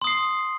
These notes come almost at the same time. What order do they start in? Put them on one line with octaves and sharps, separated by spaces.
C6 D#6 C7